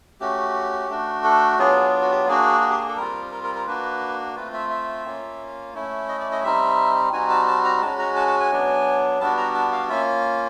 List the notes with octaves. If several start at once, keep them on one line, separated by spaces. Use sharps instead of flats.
A3 C#4 F#4 G4
A3 D4 F#4
A4
F#3 B3 D4 F4 G#4
G#4
F#4
G4
A#3 D4 F#4 G#4
F#4
G4
G#4
A4
G3 C4 F4 A#4
A#4
A#4
A#4
A#3 D4 F#4 B4
A3 C4 F4 B4
E5
E5
A#3 C#4 F4
A3 C#4 E4
D#5
D5
D#5
G3 C4 D#4 E5
G3 C4 D#4 F#4 G#5
A5
A5
A#5
G#3 C#4 F#4 A5
A#5
A5
A5
G#5
F#3 B3 D4
G3 B3 D4 F#4 A5
A#5
A5
F5
A#3 C#4 F4 E5